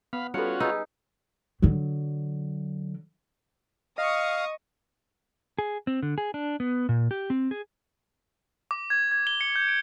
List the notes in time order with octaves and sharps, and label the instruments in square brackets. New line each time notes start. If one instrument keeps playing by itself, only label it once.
[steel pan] B3 [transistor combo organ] F5 B5
[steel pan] G3 B4 [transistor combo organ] C#4 F4 F#4 [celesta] A4 C#7
[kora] D#4 [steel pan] G#4 B4 [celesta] E6
[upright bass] D3 F#3
[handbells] D#5 [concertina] F5 [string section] C#6 D#6
[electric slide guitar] G#4
C4
D3
G#4
D4
B3
A#2
G4
C4
G#4
[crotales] D6
G#6
G#6
G7
C#7
G6
D7